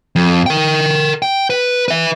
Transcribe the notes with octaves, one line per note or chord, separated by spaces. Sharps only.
F2
A#4 G5
G5
B4
B4 E5